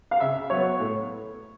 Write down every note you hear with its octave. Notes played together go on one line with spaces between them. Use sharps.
F5
C#3 E5
F#3 B3 C#5
A2